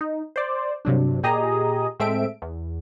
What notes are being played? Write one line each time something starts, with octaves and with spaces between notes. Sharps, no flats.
D#4
C5 D5
G2 C3 F#3 D4
A#2 G4 G#4 D#5 A#5 D#6
A2 G#3 C4 A4 E5 D7
E2